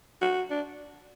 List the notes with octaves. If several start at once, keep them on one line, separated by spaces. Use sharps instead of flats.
F#4
D4